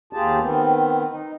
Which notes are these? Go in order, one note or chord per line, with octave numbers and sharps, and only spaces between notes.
D#2 F4 G4 G#4 A5
D#3 B3 C4
D#4